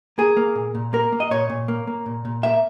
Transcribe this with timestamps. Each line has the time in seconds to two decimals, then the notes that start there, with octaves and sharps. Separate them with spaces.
0.18 A#3 G#4
0.37 A#3
0.55 A#2
0.75 A#2
0.93 A#3 A#4
1.12 A#3
1.20 D#5
1.31 A#2 C#5
1.50 A#2
1.68 A#3
1.87 A#3
2.06 A#2
2.25 A#2
2.43 A#3 E5